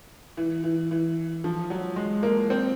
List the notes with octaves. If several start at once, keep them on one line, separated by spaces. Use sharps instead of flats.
E3
E3
E3
F3
F#3
G#3
A#3
C4